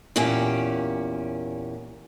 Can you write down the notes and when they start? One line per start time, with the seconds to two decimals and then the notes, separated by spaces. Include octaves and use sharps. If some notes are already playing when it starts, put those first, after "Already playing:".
0.16 E2 A#2 A#3 C#4 G4